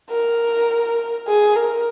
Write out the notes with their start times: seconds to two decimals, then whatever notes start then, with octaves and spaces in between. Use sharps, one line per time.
0.10 A#4
1.27 G#4
1.56 A#4